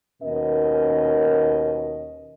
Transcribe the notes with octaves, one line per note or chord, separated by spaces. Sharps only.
D#2 B2 C#4 A#4 D#5